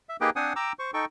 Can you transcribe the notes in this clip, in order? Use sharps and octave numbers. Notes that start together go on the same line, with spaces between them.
E5
A#3 D#4 G4 G#4 B4 G5
C4 D4 C5 F#5 G#5 D#6
G5 A#5 D6 E6
C5 C#6
D#4 A4 G5 C#6